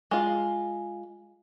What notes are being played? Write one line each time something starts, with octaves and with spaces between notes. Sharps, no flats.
G#3 F4